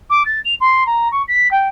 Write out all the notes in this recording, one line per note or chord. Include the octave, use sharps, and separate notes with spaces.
D6
A6
F7
C6
A#5
C#6
B6
G5